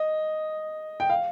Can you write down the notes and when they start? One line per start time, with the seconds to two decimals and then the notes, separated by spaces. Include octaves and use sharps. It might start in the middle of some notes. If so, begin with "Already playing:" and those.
Already playing: D#5
1.00 G5
1.10 F5